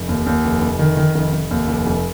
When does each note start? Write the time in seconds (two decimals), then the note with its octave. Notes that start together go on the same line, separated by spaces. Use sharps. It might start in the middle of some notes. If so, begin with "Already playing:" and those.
Already playing: F1
0.09 D#2
0.26 D#2
0.45 F1
0.62 F1
0.79 D#3
0.97 D#3
1.15 F1
1.33 F1
1.51 D#2
1.68 F1
1.87 F1